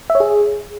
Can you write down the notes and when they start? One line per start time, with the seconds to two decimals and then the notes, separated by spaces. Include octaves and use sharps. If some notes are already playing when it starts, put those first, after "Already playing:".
0.10 E5
0.15 C#5
0.20 G#4